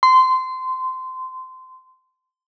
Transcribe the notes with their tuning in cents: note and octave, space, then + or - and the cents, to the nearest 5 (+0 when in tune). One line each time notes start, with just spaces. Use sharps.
C6 -20